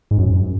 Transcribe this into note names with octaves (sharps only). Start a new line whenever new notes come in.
G#2
F#2